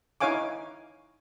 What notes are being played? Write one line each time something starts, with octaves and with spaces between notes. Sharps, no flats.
D#4 E4 C#5 F5 G#5 D6